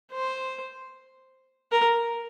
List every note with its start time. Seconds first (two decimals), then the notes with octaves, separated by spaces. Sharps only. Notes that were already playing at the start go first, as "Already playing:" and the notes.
0.12 C5
1.72 A#4